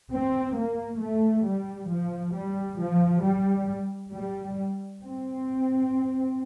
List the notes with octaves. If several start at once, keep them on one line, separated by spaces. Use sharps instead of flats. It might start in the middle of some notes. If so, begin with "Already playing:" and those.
C4
A#3
A3
G3
F3
G3
F3
G3
G3
C4